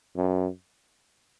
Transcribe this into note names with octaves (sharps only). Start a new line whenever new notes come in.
F#2